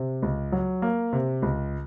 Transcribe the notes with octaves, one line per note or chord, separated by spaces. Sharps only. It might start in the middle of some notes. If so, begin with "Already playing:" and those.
Already playing: C3
C#2
F#3
A#3
C3
C#2